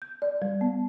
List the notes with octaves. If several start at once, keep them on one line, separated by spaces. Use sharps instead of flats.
G6
D5
G3
B3